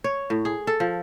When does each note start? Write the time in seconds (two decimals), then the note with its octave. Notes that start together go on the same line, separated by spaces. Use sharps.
0.04 C#5
0.30 A2
0.45 G#4
0.67 A4
0.80 F3